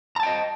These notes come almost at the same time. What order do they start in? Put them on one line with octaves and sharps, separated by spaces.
A#5 A5 G5 D#5